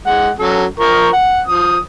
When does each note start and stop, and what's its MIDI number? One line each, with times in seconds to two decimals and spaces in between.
0.06 0.30 56
0.06 0.30 78
0.39 0.65 54
0.39 0.65 61
0.39 0.65 69
0.80 1.08 53
0.80 1.08 70
0.80 1.08 85
1.13 1.41 78
1.48 1.77 53
1.48 1.77 87